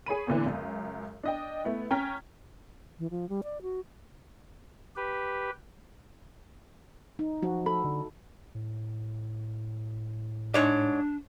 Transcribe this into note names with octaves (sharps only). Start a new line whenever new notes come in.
G#4 C#5 B5 D#7
E2 A#2 D3 E3
C#2 F#2
D4 D#5 G5
A3 B3 E4
C#4 G5 A#5 F6 B6
E3
F3
G3
D5
F#4
G4 B4
D#4
F3 F#4
A4 B5
D3
A2
G#2 D4 C#5 D5